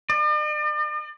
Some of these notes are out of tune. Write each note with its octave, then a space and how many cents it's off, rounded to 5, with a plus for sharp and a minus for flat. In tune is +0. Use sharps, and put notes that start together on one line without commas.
D5 +45